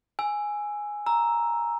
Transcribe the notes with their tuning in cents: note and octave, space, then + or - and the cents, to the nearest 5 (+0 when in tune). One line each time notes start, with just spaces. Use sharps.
G#5 +0 E6 +10
A#5 +0 E6 +0